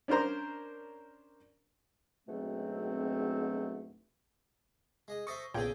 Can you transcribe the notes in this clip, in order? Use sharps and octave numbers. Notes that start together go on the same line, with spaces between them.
C#4 D4 A#4 C5 A#5
D2 G#2 B2 F#3 A3 C4
G#3 D#5
A4 C5 E5 C#6 D#6 A#6
A#1 A#2 C#3 B3 G#4 A4 G5 G#6